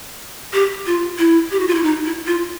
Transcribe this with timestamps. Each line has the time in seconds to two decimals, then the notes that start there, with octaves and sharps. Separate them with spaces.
0.54 G4
0.86 F4
1.19 E4
1.51 G4
1.60 F#4
1.67 F4
1.75 E4
1.83 D#4
2.05 E4
2.27 F4